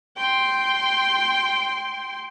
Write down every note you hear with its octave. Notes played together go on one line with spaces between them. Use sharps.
G5 C6